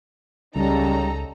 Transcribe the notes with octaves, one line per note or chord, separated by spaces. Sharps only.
C#2 C#3 G3 D#4 A4 A#5